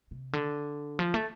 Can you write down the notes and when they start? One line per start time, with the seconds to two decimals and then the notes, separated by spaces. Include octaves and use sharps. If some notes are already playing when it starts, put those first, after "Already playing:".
0.11 C3
0.33 D3
0.99 F3
1.14 A3